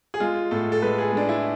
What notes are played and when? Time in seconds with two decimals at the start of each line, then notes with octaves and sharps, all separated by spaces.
0.14 G#4
0.20 G#3 F4
0.51 A2 A4
0.72 A4
0.82 G#3 B4
0.98 G#4
1.13 G#3 D4
1.29 E4